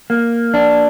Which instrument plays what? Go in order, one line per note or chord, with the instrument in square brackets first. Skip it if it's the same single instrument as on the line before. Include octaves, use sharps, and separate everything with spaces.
[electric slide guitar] A#3
D4